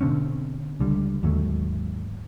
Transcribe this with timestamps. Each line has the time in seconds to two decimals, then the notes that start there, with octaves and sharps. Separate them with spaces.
0.01 B2 D3 C4 C#4
0.80 C#2 D3 G3
1.23 D#2 G#2 F#3 A3